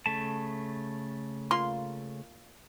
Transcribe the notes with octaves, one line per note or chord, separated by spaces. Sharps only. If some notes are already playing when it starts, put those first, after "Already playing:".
C#3 A3 A5
A#3 F4 C6